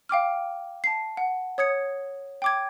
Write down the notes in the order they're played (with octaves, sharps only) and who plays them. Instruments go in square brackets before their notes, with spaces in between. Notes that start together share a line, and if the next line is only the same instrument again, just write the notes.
[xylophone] F5 G5 D6 F6
A5 C7
F#5
C#5 D#6 G#6 C#7
G5 D6 G#6